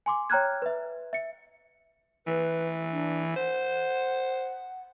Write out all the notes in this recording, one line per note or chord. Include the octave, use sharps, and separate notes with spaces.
G#5 C6 D6
C#5 G5 A#5 F6 F#6 G#6
B4 E5
E5 C#7
E3 B4
D4
C5 F#5